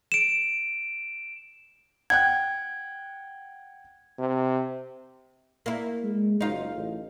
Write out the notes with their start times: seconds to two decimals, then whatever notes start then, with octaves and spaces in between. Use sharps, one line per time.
0.12 D7 E7
2.10 F#5 G5 F#6 G#6
4.19 C3
5.66 A#3 E4
6.04 G#3
6.41 F#1 D#4 F4
6.75 A1